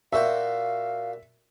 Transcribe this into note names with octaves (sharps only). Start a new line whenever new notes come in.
A#2 F#4 E5 F5 G5